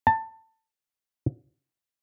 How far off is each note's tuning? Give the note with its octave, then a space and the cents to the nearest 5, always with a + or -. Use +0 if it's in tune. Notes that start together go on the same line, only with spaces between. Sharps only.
A5 +20